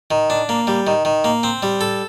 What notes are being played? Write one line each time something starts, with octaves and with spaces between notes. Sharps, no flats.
D#3
D4
A#3
G3
D#3
D#3
A#3
C4
G3
A4